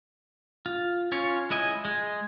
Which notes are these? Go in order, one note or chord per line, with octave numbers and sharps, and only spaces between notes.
F4
C#4 F4 C#5
G#3 E4 D#5 G#5
G#3